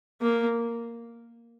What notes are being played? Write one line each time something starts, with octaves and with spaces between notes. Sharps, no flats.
A#3